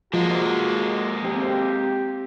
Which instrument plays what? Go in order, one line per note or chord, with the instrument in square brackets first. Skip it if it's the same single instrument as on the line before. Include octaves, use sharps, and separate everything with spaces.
[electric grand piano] F3 [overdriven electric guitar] G#3 A#3 [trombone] F#4
[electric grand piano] C4 [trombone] G4